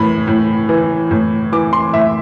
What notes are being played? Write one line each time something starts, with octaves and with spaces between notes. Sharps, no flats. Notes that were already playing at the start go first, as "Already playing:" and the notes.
Already playing: A2 E3 B5
A2
E3
A2
E3 D6
C6
A2 E5